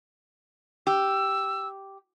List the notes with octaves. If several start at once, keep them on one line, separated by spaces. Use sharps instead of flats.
G4 E6